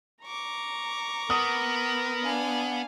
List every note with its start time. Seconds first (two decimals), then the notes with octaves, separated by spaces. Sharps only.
0.24 A#5 C#6 D6
1.30 B3 A#4 D#6
2.24 D4 F5 G#5